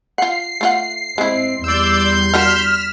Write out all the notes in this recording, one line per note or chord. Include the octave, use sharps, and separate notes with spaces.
F4 F#5 C7
A3 F4 F#5
G#3 C4 E4
E2 G3 D5 C6 E6 G6
D4 F#4 A#4 F6 B6 E7